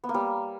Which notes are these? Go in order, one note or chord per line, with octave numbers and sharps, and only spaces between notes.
B3
A#3
G3